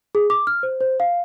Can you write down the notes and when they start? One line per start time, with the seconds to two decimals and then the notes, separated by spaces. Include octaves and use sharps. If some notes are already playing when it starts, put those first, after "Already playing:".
0.15 G#4
0.30 D6
0.47 F6
0.63 C5
0.81 C5
1.00 F5